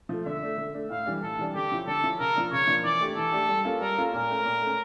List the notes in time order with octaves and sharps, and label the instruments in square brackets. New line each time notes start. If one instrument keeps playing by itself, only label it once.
[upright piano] F3 A3
[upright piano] D3 [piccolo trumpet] E5
[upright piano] A3 D4
D3
A3 D4
[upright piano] A2 [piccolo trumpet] F5
[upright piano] E3 G3 D4
[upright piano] A2 [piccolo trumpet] A4
[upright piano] E3 G3 D4
[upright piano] D3 [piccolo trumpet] G4
[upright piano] F3 C#4 E4
[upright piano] D3 [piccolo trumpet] A4
[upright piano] F3 C#4 E4
[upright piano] C#3 [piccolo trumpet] A#4
[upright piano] F3 A#3 D4
[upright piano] C#3 [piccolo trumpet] C#5
[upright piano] F3 A#3 D4
[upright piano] E3 [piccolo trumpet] D5
[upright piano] A3 D4 G4
[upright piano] E3 [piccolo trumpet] A4
[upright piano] A3 D4 G4
G3
A#3 C#4 F4 A4
[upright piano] G3 [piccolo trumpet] A#4
[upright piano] A#3 C#4 F4 A4
[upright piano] A#2 [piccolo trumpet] A#4
[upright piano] A3 C#4
A#2
A3 C#4